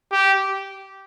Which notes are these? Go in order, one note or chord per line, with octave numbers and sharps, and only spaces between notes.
G4